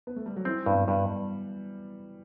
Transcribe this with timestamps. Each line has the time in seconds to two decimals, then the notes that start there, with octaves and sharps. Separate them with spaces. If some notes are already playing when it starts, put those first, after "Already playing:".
0.07 B3
0.16 A3
0.26 G3
0.37 F#3
0.45 E3 C4
0.66 G2 B3
0.88 G2 G3